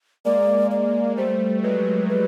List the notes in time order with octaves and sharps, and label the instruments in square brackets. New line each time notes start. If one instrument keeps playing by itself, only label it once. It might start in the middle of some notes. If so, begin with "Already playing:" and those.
[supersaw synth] G#3 A#3 [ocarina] D5
[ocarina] D5
[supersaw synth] G3 A3 [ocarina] C5
[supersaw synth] F#3 G#3 [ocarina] B4
[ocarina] B4